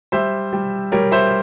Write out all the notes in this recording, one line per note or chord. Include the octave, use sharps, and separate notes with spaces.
G3 C5 E5
G3
G3 A#4 C#5
C5 E5